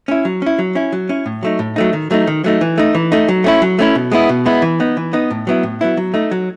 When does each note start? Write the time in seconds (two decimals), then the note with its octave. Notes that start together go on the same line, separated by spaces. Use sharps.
0.08 C#4 E4
0.25 F#3
0.42 C#4 E4
0.59 F#3
0.75 C#4 E4
0.92 F#3
1.09 C#4 E4
1.26 A2
1.43 F#3 A3 D#4
1.59 A2
1.76 F#3 A3 D#4
1.93 D#3
2.11 F#3 A3 D#4
2.27 D#3
2.44 F#3 A3 D#4
2.61 E3
2.78 A3 D#4
2.95 E3
3.12 A3 D#4
3.28 F#3
3.44 A3 C#4 E4
3.62 F#3
3.79 A3 C#4 E4
3.95 B2
4.12 G#3 B3 E4
4.29 B2
4.46 G#3 B3 E4
4.62 E3
4.80 B3 D#4
4.97 E3
5.13 B3 D#4
5.31 A2
5.47 F#3 B3 E4
5.63 A2
5.81 F#3 B3 E4
5.97 F#3
6.14 A3 D#4
6.31 F#3